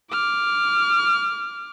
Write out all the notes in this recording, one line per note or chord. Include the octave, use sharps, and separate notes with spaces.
D6 F6